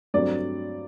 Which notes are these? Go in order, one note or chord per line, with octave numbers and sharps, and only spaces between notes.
G2 F#3 A3 C4 D5